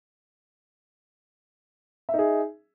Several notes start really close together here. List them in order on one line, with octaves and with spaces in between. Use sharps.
E5 D#4 G#4